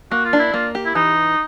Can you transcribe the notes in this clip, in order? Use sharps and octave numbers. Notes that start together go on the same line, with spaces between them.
A#3 F#4
F4
D4
E4
A#3 F4
G4
E4
E3 D#4